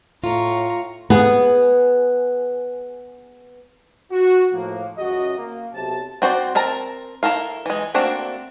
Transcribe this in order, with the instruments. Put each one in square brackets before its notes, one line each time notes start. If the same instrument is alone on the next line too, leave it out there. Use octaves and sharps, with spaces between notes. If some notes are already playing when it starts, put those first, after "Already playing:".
[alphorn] A2 [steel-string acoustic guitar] F4 [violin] A#5 C#6
[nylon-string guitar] B3 G#4
[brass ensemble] F#4
A2 F3 A#3
C#2 F#2 F#4 D#5
A#3
B1 C3 A5
[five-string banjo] C4 F#4 C5 D5
C4 A#4 A5 A#5
E4 F#4 A4 A#4 F5
E3 G#3
A3 A#3 C4 D4 F#4